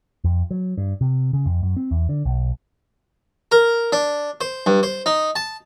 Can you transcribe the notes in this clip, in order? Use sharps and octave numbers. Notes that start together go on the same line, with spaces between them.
F2
F#3
G2
C3
C#3
F2
F#2
C4
E2
D3
B1
A#4
D4
C5
G2
C5
D#4
A5